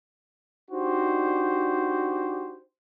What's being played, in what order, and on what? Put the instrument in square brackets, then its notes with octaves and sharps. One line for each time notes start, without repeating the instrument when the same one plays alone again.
[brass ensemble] D4 D#4 F#4 G4 C5